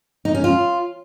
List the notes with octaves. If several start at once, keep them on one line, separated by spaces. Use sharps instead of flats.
D#4
C#4
F4